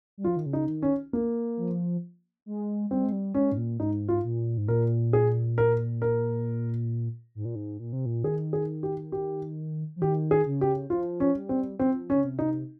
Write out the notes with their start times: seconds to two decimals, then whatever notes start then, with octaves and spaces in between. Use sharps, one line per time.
0.18 G3
0.24 F3 F4
0.36 D#3
0.46 C#3
0.53 D#4
0.68 D#3
0.82 C#4
1.13 A#3
1.57 F3
2.46 G#3
2.91 G3 C4
3.04 G#3
3.12 G3
3.34 G#3 C#4
3.52 G#2
3.57 A#2
3.79 G#2 D#4
4.08 F4
4.24 A#2
4.58 G#2
4.68 A#2 A#4
5.13 G#4
5.58 A#4
6.02 A#4
7.35 G#2
7.45 A#2
7.55 G#2
7.79 A#2
7.93 C3
8.06 A#2
8.24 D#3 G#4
8.53 G#4
8.83 G4
9.12 G4
9.96 F3
10.01 D#3 G4
10.31 G#4
10.46 C#3
10.61 G4
10.90 F3 F4
11.20 C#4
11.35 G3
11.49 C4
11.79 F3 C4
12.10 C#4
12.15 C#3
12.24 C3
12.39 D#4